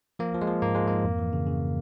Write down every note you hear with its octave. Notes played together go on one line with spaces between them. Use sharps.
F3 A#3
F3
G#3
F3
G#2 A#3
F3 G#3
G#2 A#3
F2
E3
C#3
C#3